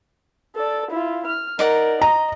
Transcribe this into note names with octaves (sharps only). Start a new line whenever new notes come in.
A4 D5
E4 F4
F6
D#4 A#4 D5 F#5
D#5 A#5